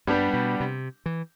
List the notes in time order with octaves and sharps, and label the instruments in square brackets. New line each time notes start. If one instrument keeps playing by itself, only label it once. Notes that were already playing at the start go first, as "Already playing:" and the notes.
[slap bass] G2 [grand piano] G3 B3 D4 G4
[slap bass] B2
C3
E3